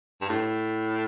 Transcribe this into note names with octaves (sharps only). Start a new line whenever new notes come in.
G2
A2